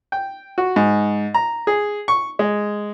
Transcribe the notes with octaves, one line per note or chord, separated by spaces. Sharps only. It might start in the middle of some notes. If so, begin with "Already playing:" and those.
G5
F#4
G#2
A#5
G#4
C#6
G#3